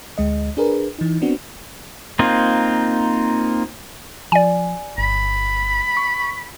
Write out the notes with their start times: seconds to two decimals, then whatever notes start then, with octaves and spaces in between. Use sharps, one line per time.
0.18 D2 G#3 D#5
0.57 D4 G#4 A#4 B4
0.99 E3 D#4
1.21 B3 C4 D4 F#4
2.19 A#3 C4 D#4 F4
4.32 F3 D5 G#5
4.98 G1 B5
5.97 C#6